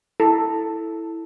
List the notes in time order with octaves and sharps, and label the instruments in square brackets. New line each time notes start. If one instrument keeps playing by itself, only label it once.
[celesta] E4 [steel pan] A4